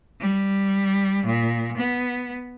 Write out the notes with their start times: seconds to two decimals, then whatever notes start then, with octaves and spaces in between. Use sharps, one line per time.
0.20 G3
1.26 A#2
1.78 B3